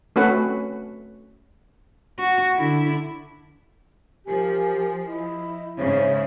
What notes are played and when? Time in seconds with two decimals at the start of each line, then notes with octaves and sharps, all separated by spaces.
0.16 A3 C4 C#4 F#4 B4 F#5
2.19 F#4
2.56 D3 E4
4.28 F3 G4 A#4 G#5
5.06 E4 D#5
5.78 G#2 C#3 C5 C#5 E5